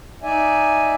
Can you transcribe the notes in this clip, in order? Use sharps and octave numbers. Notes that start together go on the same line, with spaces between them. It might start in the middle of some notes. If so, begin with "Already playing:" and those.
D#4 D5 E5 G#5